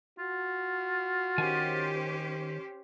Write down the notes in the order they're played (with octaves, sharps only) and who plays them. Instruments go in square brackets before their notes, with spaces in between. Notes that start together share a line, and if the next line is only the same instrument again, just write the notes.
[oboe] F4 [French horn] F#4
[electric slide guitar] D#3 G#5 [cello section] C#4 G4 C5